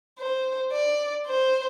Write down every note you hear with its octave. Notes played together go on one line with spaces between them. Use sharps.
C5
D5
C5